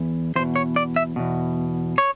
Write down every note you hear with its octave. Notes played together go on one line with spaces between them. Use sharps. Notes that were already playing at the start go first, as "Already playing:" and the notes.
Already playing: E2
E2 B2 C5
C#5
D5
E5
E2 B2
C#5